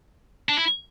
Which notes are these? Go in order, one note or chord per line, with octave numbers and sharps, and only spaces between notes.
D4
E4